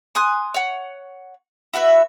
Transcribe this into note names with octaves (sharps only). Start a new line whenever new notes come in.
G#5 C6 D#6 F#6
C#5 F#5
E4 F#4 B4 E5